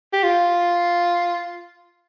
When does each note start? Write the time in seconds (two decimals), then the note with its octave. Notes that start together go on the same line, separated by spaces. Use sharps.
0.13 G4
0.23 F4